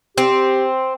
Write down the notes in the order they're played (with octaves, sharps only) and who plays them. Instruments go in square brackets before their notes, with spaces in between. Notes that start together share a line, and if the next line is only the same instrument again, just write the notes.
[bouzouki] C4 [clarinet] G4